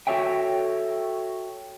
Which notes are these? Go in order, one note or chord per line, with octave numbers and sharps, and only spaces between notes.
F#4 A4 C#5 E5 G5